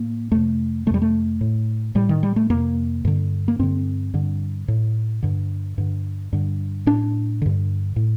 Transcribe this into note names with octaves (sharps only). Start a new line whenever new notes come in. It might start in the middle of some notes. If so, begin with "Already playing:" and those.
Already playing: A2 A#3
F2 C3 A3
F2 C3 G3 A3
A3
A2
A2 G3
D#3
G3
A3
F2 C3 A#3
G2 D3
A#3
G2 D3 C4
G2 D3
A2
G2 D3
G2 D3
G2 D3
A2 D4
G2 D3
A2